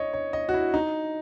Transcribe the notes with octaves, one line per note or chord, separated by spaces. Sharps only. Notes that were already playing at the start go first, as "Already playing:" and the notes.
Already playing: C#5 D#5
C#5
D#5
F#4
E4
D#4